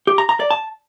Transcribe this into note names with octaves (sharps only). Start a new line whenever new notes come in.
G4
A#5
A#5
D5
A5